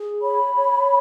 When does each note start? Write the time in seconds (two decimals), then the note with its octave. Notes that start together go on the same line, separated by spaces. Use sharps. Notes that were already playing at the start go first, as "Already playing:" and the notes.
Already playing: G#4
0.21 C#5 B5
0.55 C#5